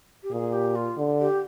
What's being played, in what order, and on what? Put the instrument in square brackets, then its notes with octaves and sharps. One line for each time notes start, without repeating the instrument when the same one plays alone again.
[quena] G4
[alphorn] A#2 [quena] G#4
[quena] G4
F4
[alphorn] D3
[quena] G4